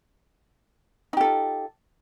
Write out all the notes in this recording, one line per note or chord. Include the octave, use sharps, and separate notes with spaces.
D#4 F4 G4 A4